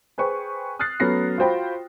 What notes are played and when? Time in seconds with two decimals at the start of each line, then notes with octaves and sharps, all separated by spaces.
0.18 G#4 B4 C5 G5 C#6
0.79 D#6 F6 F#6 A6 C7
1.00 F#3 A3 B3 C#4 A#6 C7
1.38 F4 F#4 C5 G5 B5